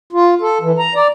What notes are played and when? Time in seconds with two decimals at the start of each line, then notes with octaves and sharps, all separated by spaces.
0.13 F4
0.41 A4
0.61 E3
0.79 A#5
0.95 D5